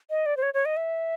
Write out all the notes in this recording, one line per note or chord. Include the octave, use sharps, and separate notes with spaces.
D#5
D5
C5
C#5
C#5
D#5
E5